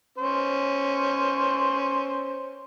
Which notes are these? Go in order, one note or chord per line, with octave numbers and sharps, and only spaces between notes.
C#4 C5